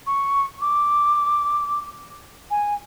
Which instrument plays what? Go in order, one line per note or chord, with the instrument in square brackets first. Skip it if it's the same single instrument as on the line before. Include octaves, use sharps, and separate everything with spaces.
[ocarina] C#6
D6
G#5